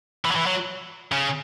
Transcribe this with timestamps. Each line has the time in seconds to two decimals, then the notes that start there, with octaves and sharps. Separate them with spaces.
0.25 E3
0.31 F#3
0.35 E3
0.46 F#3
1.12 C#3